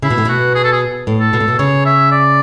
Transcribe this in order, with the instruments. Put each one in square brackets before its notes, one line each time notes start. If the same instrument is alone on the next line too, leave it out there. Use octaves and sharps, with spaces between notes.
[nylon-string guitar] C#3 [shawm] E4
[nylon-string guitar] B2
A2
[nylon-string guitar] B2 [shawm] F#4
[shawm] G#4
A4
G#4
[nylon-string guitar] A2
[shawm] A4
[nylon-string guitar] B2
A2
B2
[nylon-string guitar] C#3 [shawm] C#5
[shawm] E5
D5